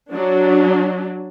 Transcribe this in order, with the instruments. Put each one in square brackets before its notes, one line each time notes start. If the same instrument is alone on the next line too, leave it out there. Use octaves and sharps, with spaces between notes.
[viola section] F#3 D4